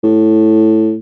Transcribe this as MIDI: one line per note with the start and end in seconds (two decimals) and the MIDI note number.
0.04 0.97 45